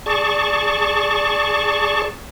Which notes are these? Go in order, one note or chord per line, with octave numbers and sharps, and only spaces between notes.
G#4 D5 A5 C#6